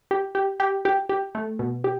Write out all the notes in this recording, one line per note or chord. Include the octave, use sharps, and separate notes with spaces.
G4
G4
G4
G4
G4
A3
B2
G4